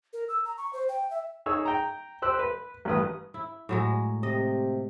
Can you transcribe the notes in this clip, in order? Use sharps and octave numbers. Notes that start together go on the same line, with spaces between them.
A#4
E6
A#5
C#6
C5
G5
E5
D#4 G#4 C#5 E6
G5 A#5
G4 C5 E6 F#6
B4
A1 G2 B4 D#6
E4
A2 F#3 G#3
C3 D#5